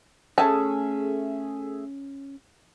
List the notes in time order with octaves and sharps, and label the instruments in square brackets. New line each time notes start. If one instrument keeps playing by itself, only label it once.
[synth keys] A3 G#4 E5 [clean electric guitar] C#4 [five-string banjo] A5